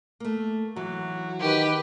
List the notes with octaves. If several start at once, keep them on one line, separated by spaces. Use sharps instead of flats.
A3 A#3
E3 F#3
D#3 G4 B4